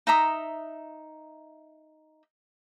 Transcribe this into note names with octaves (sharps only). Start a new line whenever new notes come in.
D#4 E5 A#5 D#6